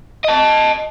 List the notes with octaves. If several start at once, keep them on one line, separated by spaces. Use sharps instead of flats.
D#5 A5